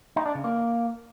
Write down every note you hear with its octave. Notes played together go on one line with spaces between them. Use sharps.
D#4
D4
C#3
A#3